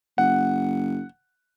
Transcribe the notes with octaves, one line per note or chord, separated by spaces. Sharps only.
F#1 F#5